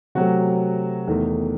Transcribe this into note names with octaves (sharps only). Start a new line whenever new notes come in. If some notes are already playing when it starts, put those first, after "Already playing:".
C3 F#3 A3 F#4
E2 D#3 A3